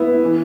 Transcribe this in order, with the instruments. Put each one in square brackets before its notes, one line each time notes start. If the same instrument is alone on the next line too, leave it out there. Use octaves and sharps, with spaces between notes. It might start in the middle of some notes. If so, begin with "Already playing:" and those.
Already playing: [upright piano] B3 E4
E3